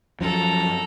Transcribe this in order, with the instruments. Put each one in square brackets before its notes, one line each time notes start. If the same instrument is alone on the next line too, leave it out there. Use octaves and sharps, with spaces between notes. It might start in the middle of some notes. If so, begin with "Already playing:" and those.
[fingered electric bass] F#2 F3 [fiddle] A4 A#5